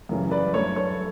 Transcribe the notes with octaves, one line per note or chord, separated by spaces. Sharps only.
F#2 C#3 E3 G3
B4 D5
G2 F#3 A3 A4 C#5
A4 C#5